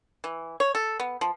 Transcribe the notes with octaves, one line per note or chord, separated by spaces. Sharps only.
E3
C#5
A4
B3
F3